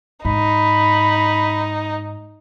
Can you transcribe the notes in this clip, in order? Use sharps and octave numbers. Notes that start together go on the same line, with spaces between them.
G#2 D#4 B5